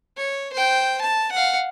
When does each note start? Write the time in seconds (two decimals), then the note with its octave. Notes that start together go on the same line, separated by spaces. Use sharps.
0.18 C#5
0.53 C5 G5
1.01 A5
1.32 F5 F#5